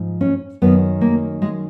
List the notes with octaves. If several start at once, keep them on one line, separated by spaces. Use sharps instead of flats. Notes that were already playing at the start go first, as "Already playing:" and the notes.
Already playing: G#2 F3
C#4
F#2 D#3 B3
A#3
G#3